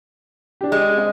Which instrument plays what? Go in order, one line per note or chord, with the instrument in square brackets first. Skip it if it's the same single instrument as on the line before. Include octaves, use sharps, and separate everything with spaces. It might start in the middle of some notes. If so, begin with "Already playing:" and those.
[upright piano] D4 G4
[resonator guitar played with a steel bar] G#3
[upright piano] C4 D#5